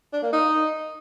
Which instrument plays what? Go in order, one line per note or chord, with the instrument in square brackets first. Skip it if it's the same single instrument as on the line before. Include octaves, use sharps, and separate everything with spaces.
[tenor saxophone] D4
A#3
D#4